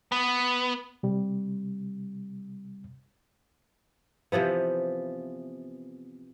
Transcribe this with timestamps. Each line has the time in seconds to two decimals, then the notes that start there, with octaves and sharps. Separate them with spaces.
0.12 B3
1.03 C3 G3
4.32 C3 E3 F3 B3